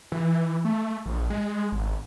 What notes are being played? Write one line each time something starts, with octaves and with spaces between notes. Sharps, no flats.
E3
A3
A#1
G#3
G#1